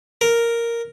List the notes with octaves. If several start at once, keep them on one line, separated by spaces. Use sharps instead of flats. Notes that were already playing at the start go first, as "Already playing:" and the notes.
A#4